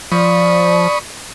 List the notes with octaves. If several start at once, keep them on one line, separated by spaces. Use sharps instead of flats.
F3 D5 B5 C#6 D#6